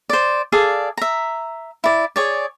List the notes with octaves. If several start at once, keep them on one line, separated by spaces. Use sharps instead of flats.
C5 D5
G#4 A4 D5 F5
E5 A#5
E4 D5
G#4 C#5 D5